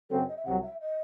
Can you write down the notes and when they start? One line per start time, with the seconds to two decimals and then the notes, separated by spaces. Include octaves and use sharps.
0.10 F#2 C#3 F#3 C4 A4
0.19 C#5
0.28 D#5
0.37 E5
0.45 C2 C3 F#3 F#5
0.63 E5
0.81 D#5